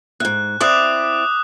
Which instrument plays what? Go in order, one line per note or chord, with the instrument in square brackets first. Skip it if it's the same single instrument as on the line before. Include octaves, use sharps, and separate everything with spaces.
[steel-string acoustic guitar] E2 G#2 [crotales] F#6
[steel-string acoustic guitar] C4 E4 D5 [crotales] D6 D#6 F#6